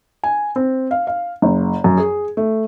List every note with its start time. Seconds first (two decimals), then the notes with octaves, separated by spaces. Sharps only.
0.24 G#5
0.56 C4
0.91 F5
1.07 F5
1.42 F#1
1.84 F#2
1.98 G#4
2.37 A3